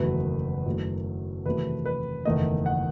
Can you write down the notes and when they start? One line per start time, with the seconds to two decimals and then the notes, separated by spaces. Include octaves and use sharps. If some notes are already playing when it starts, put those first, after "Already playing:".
Already playing: F#1 E2 D#3 F#3 A3 B4
0.66 F#2 D#3 F#3 A3 E4
1.46 E2 C3 D#3 F#3 A3 B4
1.85 B4
2.25 F#1 E2 D#3 A3 D#4 D#5
2.66 F#5